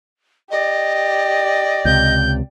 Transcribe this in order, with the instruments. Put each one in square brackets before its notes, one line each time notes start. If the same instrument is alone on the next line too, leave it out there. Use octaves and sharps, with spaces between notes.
[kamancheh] G4 D5 [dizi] D#5
[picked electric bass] C#2 C3 [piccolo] G6